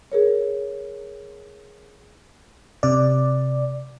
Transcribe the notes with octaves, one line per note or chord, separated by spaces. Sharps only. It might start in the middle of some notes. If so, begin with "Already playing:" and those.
G#4 A#4 C#5
C3 D5